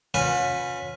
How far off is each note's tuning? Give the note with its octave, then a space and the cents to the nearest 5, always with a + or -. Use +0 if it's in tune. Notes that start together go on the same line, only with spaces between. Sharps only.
C#4 -5 F4 +45 B4 +0